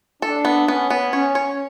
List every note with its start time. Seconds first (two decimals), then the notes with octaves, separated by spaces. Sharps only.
0.22 D4 A4
0.45 B3
0.68 B3 C#4
0.90 B3
1.13 C#4 C#5
1.35 C#5